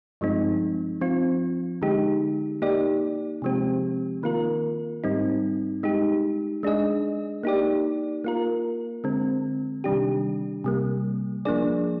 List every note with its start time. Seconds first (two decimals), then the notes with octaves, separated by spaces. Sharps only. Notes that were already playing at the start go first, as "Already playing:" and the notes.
0.21 G2 F3 G#3 C4 D#4
1.01 F3 C4 F4
1.82 D3 G#3 D#4 G4
2.62 A#3 D#4 G4 D5
3.42 C3 F3 G#3 C4 G4
4.23 D#3 A#3 F4 A#4
5.04 G#2 G3 C4 D#4
5.83 G#3 D#4 G4
6.63 G#3 D4 G#4 D#5
7.43 A#3 D#4 G4 D5
8.24 A#3 F4 A#4
9.04 D3 G#3 C4
9.84 C3 D#3 G3 D4 G4
10.64 C3 G3 A#3
11.45 F3 A#3 D4 G#4 D5